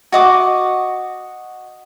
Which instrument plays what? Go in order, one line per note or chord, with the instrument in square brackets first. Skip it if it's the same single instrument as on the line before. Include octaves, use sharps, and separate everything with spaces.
[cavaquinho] F#4 D#5 D6